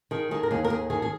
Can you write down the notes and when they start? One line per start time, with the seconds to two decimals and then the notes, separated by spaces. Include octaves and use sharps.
0.11 D#3 G#4
0.31 D#3 G#4
0.43 A#4
0.51 D#2 G#4
0.64 A#4
0.70 D#2 G#4
0.90 D#3 G#4
1.02 G#4